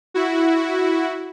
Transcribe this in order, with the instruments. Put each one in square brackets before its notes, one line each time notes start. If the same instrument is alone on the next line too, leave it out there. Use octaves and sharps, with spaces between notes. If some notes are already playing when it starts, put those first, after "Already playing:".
[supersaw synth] E4 F#4